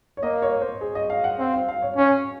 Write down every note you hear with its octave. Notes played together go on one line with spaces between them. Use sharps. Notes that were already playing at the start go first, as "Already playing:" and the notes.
C#5
A#3 D#5
C#5
C5
G#4
D#5
F5
F#5
C4 F5
F5
F5
C#5
C#4 C#5